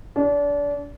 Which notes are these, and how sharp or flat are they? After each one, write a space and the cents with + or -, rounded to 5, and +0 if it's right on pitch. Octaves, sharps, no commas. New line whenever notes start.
D4 -30